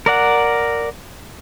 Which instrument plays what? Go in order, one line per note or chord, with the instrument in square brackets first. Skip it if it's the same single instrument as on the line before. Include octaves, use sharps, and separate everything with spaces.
[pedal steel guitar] A#4 D5 F#5